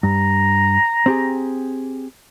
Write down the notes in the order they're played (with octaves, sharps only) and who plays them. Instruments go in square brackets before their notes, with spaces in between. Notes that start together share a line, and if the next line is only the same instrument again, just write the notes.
[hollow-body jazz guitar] G2 [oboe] A#5
[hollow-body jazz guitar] C4 G4 G#4